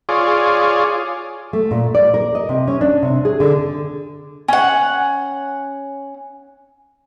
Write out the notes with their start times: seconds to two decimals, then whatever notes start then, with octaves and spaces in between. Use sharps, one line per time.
0.09 F4 G#4 C#5 D5
1.53 A3
1.71 A#2
1.95 D5
2.14 A#4
2.35 D#5
2.49 C3
2.68 C#4
2.81 D4
3.03 C3
3.25 G#4
3.40 D3
4.48 C#4 F#5